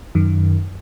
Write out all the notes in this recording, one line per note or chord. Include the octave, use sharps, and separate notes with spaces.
F#2 D#3